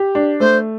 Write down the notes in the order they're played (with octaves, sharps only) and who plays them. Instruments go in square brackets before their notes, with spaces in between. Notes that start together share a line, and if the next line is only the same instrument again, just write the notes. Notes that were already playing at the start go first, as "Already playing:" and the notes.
Already playing: [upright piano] G4
D4
[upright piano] A3 [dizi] C5